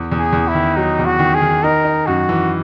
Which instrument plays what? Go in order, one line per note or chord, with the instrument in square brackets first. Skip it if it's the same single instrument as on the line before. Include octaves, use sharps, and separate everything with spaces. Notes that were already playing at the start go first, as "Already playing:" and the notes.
Already playing: [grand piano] E2
E2
[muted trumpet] G#4
[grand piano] E2
[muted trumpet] E4
[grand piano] D#3
[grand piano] F#3 [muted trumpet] D#4
[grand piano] E2
[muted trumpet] F#4
[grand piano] D#3
[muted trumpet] G#4
[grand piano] D#3
[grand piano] D#4 [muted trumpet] A#4
[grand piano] D#4
[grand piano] F#2 [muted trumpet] F#4
[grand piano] E3